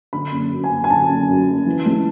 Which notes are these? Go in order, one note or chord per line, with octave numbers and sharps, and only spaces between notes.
D3 B5
F#1
F#2
G#5
F#1
G#5
D3 A5
F#1
F#2
F#1
E3
C#2